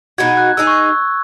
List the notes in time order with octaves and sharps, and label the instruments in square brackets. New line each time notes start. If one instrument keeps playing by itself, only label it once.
[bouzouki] B2 G#3 D#4 F#4 [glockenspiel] G#6
[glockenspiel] F#6
[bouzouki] G#3 D#4 G#4 [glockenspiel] E6
[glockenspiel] C#6